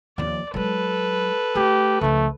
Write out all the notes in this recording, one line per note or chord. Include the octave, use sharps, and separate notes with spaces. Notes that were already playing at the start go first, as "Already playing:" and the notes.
D#2 F3 D5
F#3 G#3 A4 B4
A3 G4
C#2 F3 A3